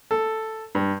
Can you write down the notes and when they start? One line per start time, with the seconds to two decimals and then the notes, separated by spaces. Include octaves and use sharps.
0.11 A4
0.75 G2